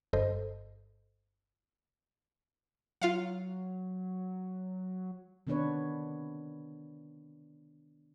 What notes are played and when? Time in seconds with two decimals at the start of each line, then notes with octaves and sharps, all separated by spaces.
0.13 G1 G2 A4 C5 D#5
3.02 F#3 F4 F5 F#5
5.47 C3 D#3 B3 D4 B4 C#5